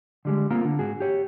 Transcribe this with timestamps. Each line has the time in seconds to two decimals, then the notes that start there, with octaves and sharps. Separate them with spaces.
0.25 D3 G3 G#3
0.50 A#3 C4 F4 A#4
0.65 D3
0.79 G#2 F#4 G#4
1.00 G4 C#5